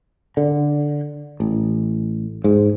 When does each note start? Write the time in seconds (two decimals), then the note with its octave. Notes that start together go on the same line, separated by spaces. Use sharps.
0.37 D3
1.40 A1
2.44 G#2